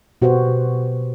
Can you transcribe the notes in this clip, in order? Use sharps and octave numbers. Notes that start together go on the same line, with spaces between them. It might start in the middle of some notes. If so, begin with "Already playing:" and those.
B2 F#4 G4 B4 C5 F#5